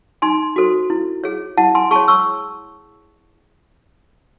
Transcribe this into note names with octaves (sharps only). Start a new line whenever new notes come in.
D#4 G#5 C6
F#4 A4 C5
E4
G#4 C#5
E4 F#5 A5
G#5 C6
G#4 C#5 A5 C#6
C#6 E6